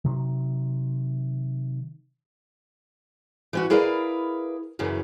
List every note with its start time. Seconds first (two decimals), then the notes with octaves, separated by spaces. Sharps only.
0.05 C3 D#3 F#3
3.53 E3 C#4 F#4
3.70 E4 G#4 A#4 B4 D5 F5
4.79 F#2 C#3 E3 F#3